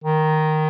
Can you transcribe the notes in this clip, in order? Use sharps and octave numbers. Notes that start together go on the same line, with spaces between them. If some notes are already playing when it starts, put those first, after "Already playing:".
D#3